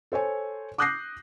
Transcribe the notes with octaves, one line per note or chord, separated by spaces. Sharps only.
A4 C5 C#5 G#5
D6 D#6 F#6 G6 A#6 C7